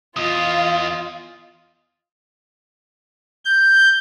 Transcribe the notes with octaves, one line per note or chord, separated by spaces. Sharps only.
E2 F4 D#5 F5 D#6
G6